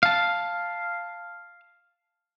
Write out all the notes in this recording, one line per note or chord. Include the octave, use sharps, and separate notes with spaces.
F5 A5